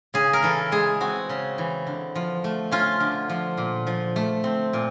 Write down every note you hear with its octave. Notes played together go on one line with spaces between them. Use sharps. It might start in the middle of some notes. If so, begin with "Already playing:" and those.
C#3 G#4
A#4
E3 A4
G#3 G#4
C4 F#4
C#3
E3
D3
F3
A3
C#4 F4
D3
F3
A#2
F3
A3
C4
A#2